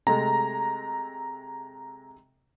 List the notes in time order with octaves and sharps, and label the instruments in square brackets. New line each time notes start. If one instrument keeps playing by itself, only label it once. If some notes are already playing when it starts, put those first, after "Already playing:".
[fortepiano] C3 G#3 A3 [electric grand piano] A#5